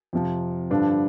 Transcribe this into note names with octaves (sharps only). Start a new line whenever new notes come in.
F2 C3 F3
G2 D3 F3 D4